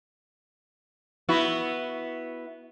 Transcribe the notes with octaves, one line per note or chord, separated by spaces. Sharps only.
B3 E4 F#4